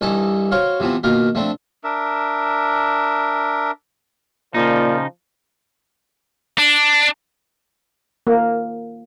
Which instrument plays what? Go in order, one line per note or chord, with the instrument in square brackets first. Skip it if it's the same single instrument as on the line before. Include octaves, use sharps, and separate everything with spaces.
[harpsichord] C2 G2 E3 D#4 A4 A5
F#4 C5 C#5 F5
C3 E3 F3 B3 C4
B2 D#3 A#3 F4 A#4
F3 A3 C4 D4
[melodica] D4 A#4 E5
[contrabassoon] A#2 [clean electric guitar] C#3 D#4 [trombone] F3 [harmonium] A#4 D5
[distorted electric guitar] D4
[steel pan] A#3